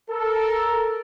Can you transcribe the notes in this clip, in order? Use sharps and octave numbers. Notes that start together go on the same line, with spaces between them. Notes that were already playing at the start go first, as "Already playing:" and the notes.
A4 A#4